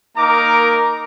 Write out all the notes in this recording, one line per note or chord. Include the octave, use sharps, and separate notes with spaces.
A#3 D#4 A#4 A#5 D6